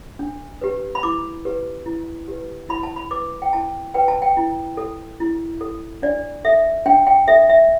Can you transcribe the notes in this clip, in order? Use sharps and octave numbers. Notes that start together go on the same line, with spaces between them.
D4
G4 B4
B5
E4 D6
G4 B4
E4
G4 B4
E4 B5
A5
B5
B4 D6
G5
E4 A5
B4 G5
A5
G5
E4
A4
E4
A4
D4 D5
A4 E5
D4 G5
G5
A4 E5
E5